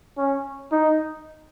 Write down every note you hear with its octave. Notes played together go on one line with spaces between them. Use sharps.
C#4
D#4